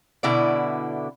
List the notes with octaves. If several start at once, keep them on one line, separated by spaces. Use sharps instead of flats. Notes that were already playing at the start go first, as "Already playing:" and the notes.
B2 D3 E4 D5